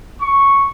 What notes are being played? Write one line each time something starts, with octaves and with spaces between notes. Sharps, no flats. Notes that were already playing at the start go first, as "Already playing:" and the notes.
C#6